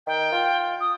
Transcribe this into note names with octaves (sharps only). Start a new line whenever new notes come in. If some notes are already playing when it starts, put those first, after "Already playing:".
D#3 G5
F4
D#6